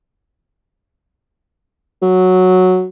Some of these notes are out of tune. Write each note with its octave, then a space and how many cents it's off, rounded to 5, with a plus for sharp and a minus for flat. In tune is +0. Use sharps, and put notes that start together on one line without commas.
F#3 -5